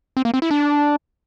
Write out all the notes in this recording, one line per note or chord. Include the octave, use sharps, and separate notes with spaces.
C4
A#3
C4
E4
D4